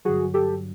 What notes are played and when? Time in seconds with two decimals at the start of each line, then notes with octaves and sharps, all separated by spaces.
0.05 G2 D3 F#3 F#4 G#4
0.34 G4 A4